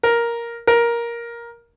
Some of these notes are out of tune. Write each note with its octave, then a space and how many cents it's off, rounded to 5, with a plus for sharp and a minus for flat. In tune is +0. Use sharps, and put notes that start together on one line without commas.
A#4 +5
A#4 +10